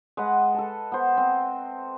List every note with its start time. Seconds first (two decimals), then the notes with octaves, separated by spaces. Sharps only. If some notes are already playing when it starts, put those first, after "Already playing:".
0.17 G#3 B4 D#5 F#5
0.54 A4 A5
0.92 B3 C5
1.17 C4 D#5